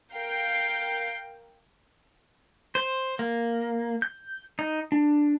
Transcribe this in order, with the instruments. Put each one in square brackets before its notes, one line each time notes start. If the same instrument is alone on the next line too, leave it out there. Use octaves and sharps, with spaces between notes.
[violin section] A#4 F5 G5 G6 C7
[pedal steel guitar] C5
A#3
G6
D#4
D4